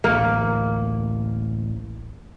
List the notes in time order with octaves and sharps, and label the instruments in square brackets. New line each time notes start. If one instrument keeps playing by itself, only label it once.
[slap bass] A1 D2 A2 [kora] A#3